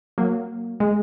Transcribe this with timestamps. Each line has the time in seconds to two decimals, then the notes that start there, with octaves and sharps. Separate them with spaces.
0.18 F#3 A#3
0.80 G#3